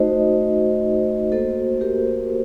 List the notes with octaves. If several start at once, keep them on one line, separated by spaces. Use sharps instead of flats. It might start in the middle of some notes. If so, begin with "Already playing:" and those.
Already playing: A3 D#4 F#4 C5 D#5
A#3 F#4 A4 C5
G4 A#4